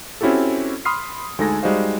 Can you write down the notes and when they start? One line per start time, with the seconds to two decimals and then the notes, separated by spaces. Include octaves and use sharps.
0.21 C4 C#4 E4 F#4 G4 A4
0.85 B5 C6 D#6 F6 C7
1.38 D2 G#3 D#4 A4 G#5 A#6
1.63 G3 G#3 D#4 F#4 C5 F5